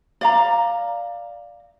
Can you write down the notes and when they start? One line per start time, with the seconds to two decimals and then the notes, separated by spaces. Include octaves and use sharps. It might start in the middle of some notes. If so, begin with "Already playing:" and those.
0.21 D5 F5 A#5